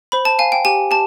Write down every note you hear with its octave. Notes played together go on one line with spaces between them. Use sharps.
C5 B5
A5
F5 G#5
G5
G4 G#5
G4 A5